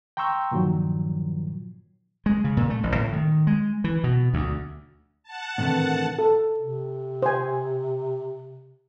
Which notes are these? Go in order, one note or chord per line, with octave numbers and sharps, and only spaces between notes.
G5 A#5 C6 C#6 E6 G6
G2 A#2 D#3 F3 F#3
G#3
C#3
A#2
A3
A1
A2
D#3
G#3
E3
B2
D2
F#5 A5
A2 C3 D#3 E3 A3 D4
A4
C3
C5 G#5